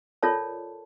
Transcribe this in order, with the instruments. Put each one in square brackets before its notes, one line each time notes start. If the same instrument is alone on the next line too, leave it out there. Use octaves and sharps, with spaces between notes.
[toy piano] F4 A4 A#4 C#5 D5 A5